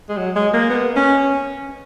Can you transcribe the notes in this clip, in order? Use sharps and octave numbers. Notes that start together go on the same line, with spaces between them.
G#3
F#3
G#3
A#3
B3
C#4